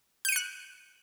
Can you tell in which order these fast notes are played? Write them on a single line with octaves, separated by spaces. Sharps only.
G6 D#7 C#7 F#6